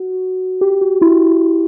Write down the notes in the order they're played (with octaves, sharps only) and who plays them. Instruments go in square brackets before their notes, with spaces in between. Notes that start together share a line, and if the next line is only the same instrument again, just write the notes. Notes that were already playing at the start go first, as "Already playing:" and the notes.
Already playing: [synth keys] F#4
G4
F#4
E4